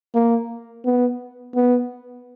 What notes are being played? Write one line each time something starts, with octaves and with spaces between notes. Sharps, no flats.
A#3
B3
B3